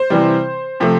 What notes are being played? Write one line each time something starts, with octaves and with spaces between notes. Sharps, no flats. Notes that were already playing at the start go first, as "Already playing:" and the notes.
Already playing: C5
C3 E3 G3
C3 F3 A3